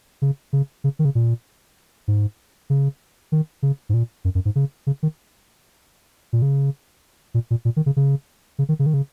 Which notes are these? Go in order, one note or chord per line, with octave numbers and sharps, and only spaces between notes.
C#3
C#3
C#3
D#3
C#3
A#2
G#2
C#3
D#3
C#3
G#2
A#2
F#2
F#2
G#2
C#3
C#3
D#3
A#2
C#3
A#2
A#2
A#2
D#3
C#3
C#3
C#3
D#3
C#3
D#3
C#3